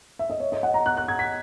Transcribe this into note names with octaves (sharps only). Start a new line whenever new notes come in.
E5
D#5
C#5
D#5
F#5
A#5
F#6
F#6
G#6
B6